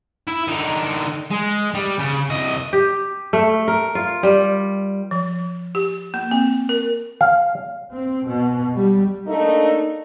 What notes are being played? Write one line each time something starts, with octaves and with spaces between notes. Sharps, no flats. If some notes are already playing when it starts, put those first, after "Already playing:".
E4
D3 D#4
G#3
G3
C#3
C2 D#5
G4
A3
A#4
F4
G3
F3
G4
A#3
C4
A#4
F5
C4
B2
G3
A3 A#3 D4 D#4